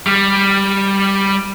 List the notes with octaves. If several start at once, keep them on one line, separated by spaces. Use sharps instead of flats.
G3